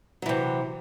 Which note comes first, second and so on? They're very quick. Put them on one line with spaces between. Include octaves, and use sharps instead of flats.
F#3 E3 C3